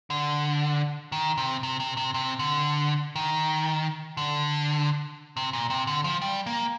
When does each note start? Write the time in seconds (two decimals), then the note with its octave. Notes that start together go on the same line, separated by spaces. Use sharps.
0.10 D3
1.12 D#3
1.37 C3
1.63 C3
1.80 C3
1.97 C3
2.14 C3
2.39 D3
3.16 D#3
4.17 D3
5.37 C3
5.53 A#2
5.70 C3
5.87 D3
6.04 F3
6.22 G3
6.46 A#3